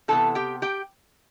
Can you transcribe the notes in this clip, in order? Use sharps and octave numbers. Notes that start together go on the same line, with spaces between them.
C3 E3 B3 A4 A5
G4 G5
G4 G5